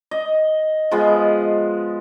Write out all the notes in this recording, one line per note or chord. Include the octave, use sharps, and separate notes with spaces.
D#5
F3 G#3 B3